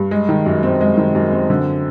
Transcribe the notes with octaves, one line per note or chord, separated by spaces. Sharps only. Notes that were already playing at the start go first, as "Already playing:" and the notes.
Already playing: G2
G#3
D#3
F#2
C4
G#3
D#3
F#2
C4
D3